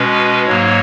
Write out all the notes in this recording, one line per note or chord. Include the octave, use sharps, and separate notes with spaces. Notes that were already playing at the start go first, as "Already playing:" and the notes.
Already playing: B2 G#3 C#4 B4
G#2 F#3 A#3 C#5